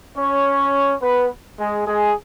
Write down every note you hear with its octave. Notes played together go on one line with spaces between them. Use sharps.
C#4 C#5
B3 B4
G#3 G#4
G#3 G#4